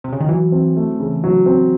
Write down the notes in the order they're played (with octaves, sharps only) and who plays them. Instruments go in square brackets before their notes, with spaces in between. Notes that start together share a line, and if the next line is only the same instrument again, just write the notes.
[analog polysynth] C3
C#3
D#3
[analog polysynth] E3 [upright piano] F#3
[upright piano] C4
A3
C#3
F#3
C4